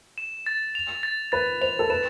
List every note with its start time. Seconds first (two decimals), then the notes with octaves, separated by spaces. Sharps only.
0.18 E7
0.46 A6
0.75 F7
1.03 A6
1.32 B4 A6
1.61 C5 F7
1.79 A4
1.90 B4 E7